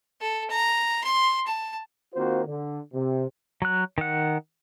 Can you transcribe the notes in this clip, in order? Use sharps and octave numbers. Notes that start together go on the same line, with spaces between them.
A4
A#5
C6
A5
D#3 A#3 C4 F4 F#4 C5
D3
C3
F#3 F#6
D#3 F#5